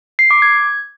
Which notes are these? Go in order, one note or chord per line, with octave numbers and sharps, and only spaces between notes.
C7
D6
G#6